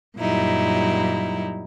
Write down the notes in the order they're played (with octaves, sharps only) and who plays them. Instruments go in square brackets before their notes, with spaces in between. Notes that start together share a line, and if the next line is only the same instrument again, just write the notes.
[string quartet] F#2 A#2 F#3 G3 D#4 E4